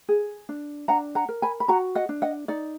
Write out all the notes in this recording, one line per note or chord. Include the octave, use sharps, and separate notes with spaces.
G#4
D4
D4 F#5 A#5
F#5 A#5
A#4
G#5 B5
B5
F#4 F#5 A#5
D#5 F#5
D4
D#5 F#5
D#4 D5